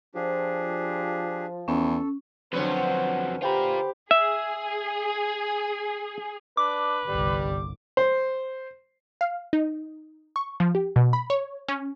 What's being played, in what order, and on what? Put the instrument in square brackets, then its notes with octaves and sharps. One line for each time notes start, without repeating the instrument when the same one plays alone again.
[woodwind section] F3 [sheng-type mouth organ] D4 G4 G#4
[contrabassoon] E2 [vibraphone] C#4 [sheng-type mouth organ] A4
[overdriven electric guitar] F2 F#3 [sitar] D3 C#4 B4 [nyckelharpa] C5
[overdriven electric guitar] F4 A#4 [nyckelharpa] G4 [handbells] C5 G5 B5
[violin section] G#4 [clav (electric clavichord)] E5
[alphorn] D4 [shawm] B4 [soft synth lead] D6
[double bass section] G1 C2 D3 [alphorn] G3
[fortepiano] C5
[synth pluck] F5
D#4
C#6
F3
G4
B2
B5
C#5
C#4